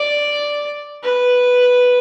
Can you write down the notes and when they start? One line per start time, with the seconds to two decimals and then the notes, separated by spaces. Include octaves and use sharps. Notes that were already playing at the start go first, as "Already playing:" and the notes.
Already playing: D5
1.03 B4